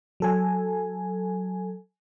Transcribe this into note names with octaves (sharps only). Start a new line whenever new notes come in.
F#3 A4 G#5